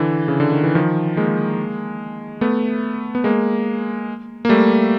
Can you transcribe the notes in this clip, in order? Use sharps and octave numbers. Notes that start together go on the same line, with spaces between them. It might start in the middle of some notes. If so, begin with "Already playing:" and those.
Already playing: D3 E3
C#3
D3
D#3
E3
D#3 F3
G#3 A#3
A3 B3
B3
G#3 A#3
A#3
G3 A3